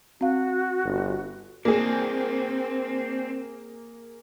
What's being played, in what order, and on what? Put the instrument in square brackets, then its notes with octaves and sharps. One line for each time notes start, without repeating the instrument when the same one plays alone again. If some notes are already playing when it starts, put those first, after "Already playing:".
[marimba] C4 F5 [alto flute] F#4
[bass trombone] G1
[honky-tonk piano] A#3 G#4 [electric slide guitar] C4 D4